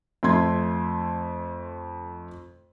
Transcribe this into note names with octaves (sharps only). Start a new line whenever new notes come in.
F2 A3 C6 G#6